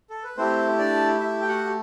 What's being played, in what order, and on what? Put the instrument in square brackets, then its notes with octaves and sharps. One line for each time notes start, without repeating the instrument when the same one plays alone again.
[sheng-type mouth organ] A4
B4
A3 C4 E4 G4 C5
D4 D5
E4 E5
G5
F#4 F#5